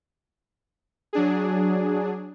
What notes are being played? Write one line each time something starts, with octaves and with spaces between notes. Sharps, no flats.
F#3 D4 G#4